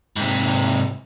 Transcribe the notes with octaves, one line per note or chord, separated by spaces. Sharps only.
G#2 C3